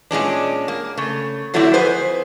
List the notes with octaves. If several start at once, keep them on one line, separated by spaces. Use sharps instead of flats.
A#2 G#3 C#4 D4
A#3
C#3 A3
D3 F#3 A3 C4 D4 E4
F2 G#4 B4 C5